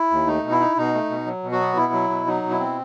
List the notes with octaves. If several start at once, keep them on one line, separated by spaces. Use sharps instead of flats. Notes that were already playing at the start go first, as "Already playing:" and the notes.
Already playing: E4
D#2
A3 D#4
B2
E4
D#4
B2 D#4
A3
B2
F#3
B2
F#3 F#4
B3
B2 E4
F#3
B2
F#3 D#4
B2
E4
C4